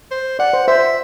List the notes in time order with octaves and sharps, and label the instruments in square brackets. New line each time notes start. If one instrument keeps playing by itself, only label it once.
[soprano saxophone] C5
[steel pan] D5 [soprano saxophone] F#5
[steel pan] C5
[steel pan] C5 [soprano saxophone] E5